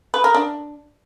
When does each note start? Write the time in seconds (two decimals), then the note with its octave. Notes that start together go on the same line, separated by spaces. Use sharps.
0.14 B4
0.24 A#4
0.35 D4